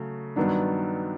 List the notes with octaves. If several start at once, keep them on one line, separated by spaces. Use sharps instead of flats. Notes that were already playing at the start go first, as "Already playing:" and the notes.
Already playing: C#3 F#3 A3
G2 D#3 F#3 B3 D4